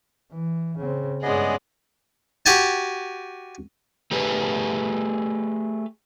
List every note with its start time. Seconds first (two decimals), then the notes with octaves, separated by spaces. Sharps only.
0.33 E3
0.78 C#3 C4
1.23 G2 G#3 B3 C#4 G#4 D5 D#5
2.46 F#4 G4 G#5 A5
4.11 A3 G4 G#4 B4